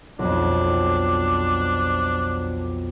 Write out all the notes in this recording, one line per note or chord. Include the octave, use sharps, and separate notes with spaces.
B1 F2 D4